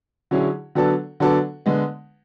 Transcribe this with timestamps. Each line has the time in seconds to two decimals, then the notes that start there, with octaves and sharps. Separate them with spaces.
0.31 D3 F#3 C#4 E4 G#4
0.75 D3 F#3 B3 D4 A4
1.20 D3 F#3 B3 D4 A4
1.66 D3 G#3 B3